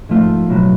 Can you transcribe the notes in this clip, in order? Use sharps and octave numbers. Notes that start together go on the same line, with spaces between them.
G#2 F3 A3 F4
B1 A2 F#3